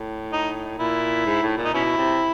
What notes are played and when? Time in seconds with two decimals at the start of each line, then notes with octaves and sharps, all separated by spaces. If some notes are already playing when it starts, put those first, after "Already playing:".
Already playing: A2
0.33 D#4
0.79 A#2 E4
1.26 G#2
1.42 A2
1.57 A#2
1.65 D#4
1.73 B2 C#4 E4
1.97 C3